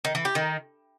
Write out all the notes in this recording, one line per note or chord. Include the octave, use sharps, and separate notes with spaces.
D#3
E3
G4
D#3